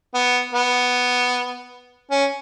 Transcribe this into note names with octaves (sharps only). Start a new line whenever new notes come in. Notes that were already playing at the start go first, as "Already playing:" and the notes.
B3
B3
C#4